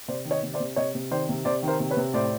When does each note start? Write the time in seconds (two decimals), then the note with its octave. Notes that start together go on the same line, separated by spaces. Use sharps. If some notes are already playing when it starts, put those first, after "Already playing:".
0.08 C3 C5 D5
0.25 D#3
0.31 C#5 D#5
0.43 C3
0.54 C5 D5
0.60 C3
0.76 C3 C#5 D#5
0.95 C3
1.11 D#3 C5 D5
1.29 C3
1.45 C3 C5 D5
1.63 D#3
1.68 A#4 C5
1.80 C3
1.91 B4 C#5
1.97 C3
2.13 A2 C5 D5